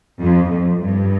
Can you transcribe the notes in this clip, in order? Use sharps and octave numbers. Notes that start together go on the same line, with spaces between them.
F2
F2
G2